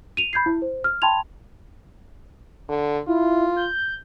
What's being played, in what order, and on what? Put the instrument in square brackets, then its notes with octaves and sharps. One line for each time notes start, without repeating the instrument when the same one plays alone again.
[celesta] D#7 F7
B5 G6 G#6 C7
E4
C5
F6
G5 A5 B5 C6 G#6 F7
[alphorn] D3
[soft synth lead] E4 [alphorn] F4
[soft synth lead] G6